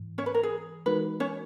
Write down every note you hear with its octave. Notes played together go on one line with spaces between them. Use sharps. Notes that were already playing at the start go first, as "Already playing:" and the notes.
Already playing: G#2 E3
C#4 C#5
B4
A#4
G#4
E3 G#3 D#4 F#4 A#4 B4
C#4 C#5